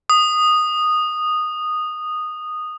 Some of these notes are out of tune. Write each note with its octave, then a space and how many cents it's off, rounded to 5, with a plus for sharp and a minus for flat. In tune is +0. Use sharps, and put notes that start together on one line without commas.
D#6 -10